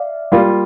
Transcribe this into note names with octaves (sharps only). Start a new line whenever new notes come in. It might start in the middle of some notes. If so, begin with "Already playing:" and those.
Already playing: D5 E5 F5
G3 A#3 F4 D5 F5